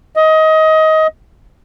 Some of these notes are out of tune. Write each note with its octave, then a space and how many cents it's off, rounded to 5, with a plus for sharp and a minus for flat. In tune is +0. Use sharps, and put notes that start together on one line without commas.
D#5 +20